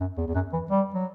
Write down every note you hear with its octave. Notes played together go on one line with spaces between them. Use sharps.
F#2
E2
E2
F#2
E3
G3
F#3